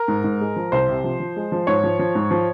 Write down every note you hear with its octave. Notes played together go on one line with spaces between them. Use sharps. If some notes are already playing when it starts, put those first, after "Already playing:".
Already playing: A#4
G#2
G#2
G#3
F3
C2 C5
C3
F3
F3
G#3
F3
G#2 C#5
F3
F3
G#2
F3